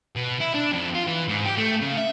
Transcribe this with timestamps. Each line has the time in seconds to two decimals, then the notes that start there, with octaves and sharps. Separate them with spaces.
0.16 B2
0.40 E4
0.55 D4
0.73 F2
0.95 F4
1.07 E3
1.28 G#2
1.45 G4
1.57 A3
1.81 C#3
1.97 E5